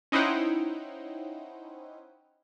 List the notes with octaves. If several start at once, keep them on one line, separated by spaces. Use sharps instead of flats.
C#4 D#4 E4 C5 F#5 G5